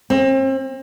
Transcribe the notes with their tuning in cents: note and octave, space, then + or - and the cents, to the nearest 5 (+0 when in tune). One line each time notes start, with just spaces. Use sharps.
C4 +40